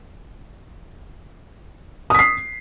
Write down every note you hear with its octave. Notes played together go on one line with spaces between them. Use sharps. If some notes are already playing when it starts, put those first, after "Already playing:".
D#6 B6 C7